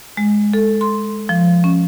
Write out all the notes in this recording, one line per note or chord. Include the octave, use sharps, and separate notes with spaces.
G#3
A4
C6
F3
C#4